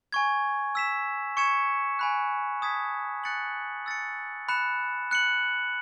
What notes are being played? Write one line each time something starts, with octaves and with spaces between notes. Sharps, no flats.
G#5 C#6 G#6
E6 B6 E7
C#6 G#6 C#7 E7
G#5 B5 F#6
A5 D#6 G#6 B6
F#6 A6 C#7 F#7
E6 A6 C#7
B5 F#6 C#7 E7
F#6 C#7 F#7